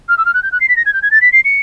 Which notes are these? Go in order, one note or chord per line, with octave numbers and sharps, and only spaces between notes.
F6
E6
F6
F#6
G6
F#6
C7
B6
A#6
G#6
G6
G#6
A6
B6
C7
C#7